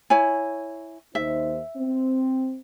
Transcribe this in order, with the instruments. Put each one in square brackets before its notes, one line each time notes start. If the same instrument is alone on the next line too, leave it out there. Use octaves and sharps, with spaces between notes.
[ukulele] E4 C#5 G#5
[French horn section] D#2 D#4 C5 [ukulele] E5
[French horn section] C4